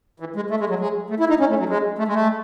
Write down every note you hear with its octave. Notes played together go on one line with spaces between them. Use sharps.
E3
G#3
A3
G#3
F#3
G#3
A3
E4
D#4
C#4
A3
F#3
G#3
A3
G#3
A3